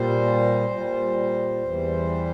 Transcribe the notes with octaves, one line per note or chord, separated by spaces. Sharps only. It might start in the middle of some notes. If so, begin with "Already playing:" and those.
Already playing: A#2 G3 C5
A#2 G3
E2 E3 G3